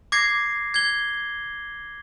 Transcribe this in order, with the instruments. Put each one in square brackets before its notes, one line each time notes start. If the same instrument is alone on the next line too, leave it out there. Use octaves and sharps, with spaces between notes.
[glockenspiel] D6 G#6 A#6 C7
G#6 G7